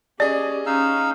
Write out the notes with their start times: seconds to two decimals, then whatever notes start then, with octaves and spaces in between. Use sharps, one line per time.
0.20 C#4 G4 G#4 D5 D#5
0.66 C#4 D#4 F5 E6